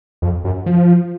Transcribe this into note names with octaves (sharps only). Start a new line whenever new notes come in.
F2
F#2
F3